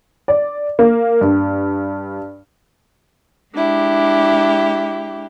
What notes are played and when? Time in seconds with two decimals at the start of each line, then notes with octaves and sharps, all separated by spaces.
0.28 D5
0.79 A#3
1.21 G2
3.55 G#3 D4 E4 G4